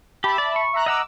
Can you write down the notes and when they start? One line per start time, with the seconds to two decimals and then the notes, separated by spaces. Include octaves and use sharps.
0.24 G4 E5 A5 B5
0.38 D5
0.56 C#6
0.73 E5 A#5 F#6
0.86 D#5 F#5 A#5 D6 E6